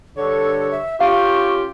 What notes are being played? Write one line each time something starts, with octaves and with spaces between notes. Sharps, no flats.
G2 D3 A4 C#5
E5
C#4 F4 G4 F5 C#6